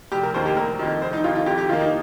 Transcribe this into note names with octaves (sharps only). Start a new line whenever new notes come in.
F1 G4
A#4
D#2 D#3 A#3 C5
G4
F1 A#4
F2 D#3
F1 C5
D#4
F2 D#3 F4
F4
F2 G4
G4
D#3 A#3 F4
D#4